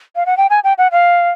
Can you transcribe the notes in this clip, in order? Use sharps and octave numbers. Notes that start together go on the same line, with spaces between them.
F5
F#5
G5
G#5
G5
F#5
F5